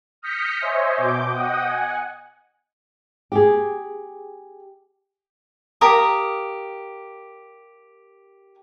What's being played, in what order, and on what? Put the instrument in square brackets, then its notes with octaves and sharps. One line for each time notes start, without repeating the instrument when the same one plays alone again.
[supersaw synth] D#6 F6 G6 A#6 B6 C#7
C5 C#5 D#5 E5 G#5
B2 D6 G6
D#5 F#5 G5 D#6
F#5 G#5
[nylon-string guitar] G4 G#4
[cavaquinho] G4 A#4 F5 D#6